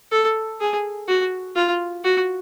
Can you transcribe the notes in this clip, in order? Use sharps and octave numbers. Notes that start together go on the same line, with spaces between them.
A4
G#4
F#4
F4
F#4